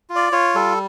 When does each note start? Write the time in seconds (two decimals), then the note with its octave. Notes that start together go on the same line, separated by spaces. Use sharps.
0.10 F4
0.16 D5
0.32 F4 C#5
0.55 G3 A4